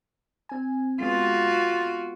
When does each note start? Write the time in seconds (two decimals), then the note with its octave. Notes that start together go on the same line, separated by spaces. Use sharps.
0.49 C4 G#5
1.00 G#3 B3 F4 F#4